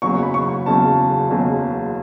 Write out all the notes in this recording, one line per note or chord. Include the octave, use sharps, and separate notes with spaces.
F#1 E2 C#3 F#3 C#6
B5
C#6
F#1 E2 C#3 F#3 A5
F#1 E2 C#3 F#3